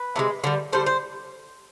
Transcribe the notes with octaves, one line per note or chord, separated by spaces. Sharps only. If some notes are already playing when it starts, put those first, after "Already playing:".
Already playing: B4
C3 F3 G#3
D3 G3
D3 G3 C5
C5